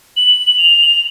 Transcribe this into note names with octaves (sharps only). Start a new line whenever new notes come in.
F#7
F7